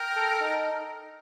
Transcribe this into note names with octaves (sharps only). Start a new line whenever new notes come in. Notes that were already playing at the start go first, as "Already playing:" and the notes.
Already playing: A#4 G5
A4
D#4